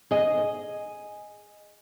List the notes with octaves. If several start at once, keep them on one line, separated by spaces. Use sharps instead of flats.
G#4 D#5